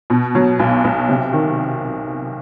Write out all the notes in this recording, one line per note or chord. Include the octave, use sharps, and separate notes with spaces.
B2
F#3
B1
B1
C3
D#3